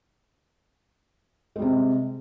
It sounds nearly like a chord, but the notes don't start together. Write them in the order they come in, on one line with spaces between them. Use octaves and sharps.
G#3 G3 C3